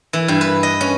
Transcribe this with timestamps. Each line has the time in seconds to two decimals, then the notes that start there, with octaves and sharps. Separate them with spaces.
0.13 E3
0.28 G2
0.41 B4
0.63 D#5
0.81 C#4